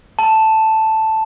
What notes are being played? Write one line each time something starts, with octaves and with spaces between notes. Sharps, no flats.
A5